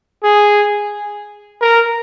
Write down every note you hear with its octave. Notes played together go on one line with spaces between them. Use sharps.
G#4
A#4